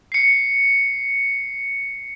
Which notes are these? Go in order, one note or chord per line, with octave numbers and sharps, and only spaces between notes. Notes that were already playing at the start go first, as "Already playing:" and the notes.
C7 C#7